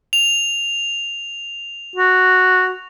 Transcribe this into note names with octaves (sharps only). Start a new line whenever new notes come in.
F7
F#4